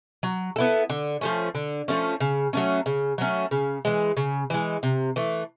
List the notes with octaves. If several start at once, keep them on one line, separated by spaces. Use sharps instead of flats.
F#3
B3 E4 A4
D3
F3 A3 C#4
D3
F3 A3 C#4
C#3
F#3 A3 C#4
C#3
F#3 A3 C#4
C#3
E3 G#3
C#3
E3 G#3
C3
E3 A3